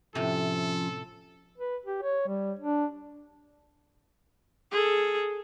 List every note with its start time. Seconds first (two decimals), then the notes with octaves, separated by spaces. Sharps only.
0.15 A2 C3 F3 C#4 F4 A4
1.58 B4
1.86 G4
2.02 C#5
2.28 G3
2.59 D4
4.71 G#4 A4